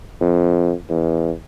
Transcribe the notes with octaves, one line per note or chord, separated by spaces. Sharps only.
F2
E2